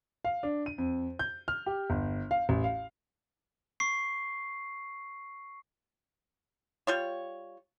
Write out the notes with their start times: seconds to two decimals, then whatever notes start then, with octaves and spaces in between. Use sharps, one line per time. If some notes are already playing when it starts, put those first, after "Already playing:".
0.25 F5
0.43 D4
0.66 D#7
0.78 F2
1.19 G6
1.48 F6
1.66 G4
1.90 G1
2.31 F5
2.49 A1
2.64 F5
3.80 C#6 C7
6.87 G3 F4 C#5